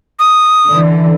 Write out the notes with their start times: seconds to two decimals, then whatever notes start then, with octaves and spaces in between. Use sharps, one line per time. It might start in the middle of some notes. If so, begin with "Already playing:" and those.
0.19 D#6
0.69 D3 E3